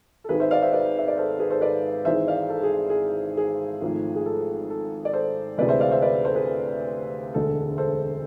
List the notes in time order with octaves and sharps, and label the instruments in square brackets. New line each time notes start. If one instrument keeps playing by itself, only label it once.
[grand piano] A4
G#1 G#2 G#3 G#4 B4
C5 E5
D5 F5
C5 E5
B4 D5
E5
D5
A4 C5
G#4 B4
A4 C5
B4 D5
G#1 G#2 E3 G#3 C5 E5
D5 F5
A4
G#4
G#4
G#4
G#1 G#2 F3 A3
G#4
A4
A4
D5
A4 C5
D2 C3 E3 G#3 B4 D5
C5 E5
D5 F5
C5 E5
B4 D5
A4 C5
G#4 B4
E1 D2 D3 G#3 A4
A4 C5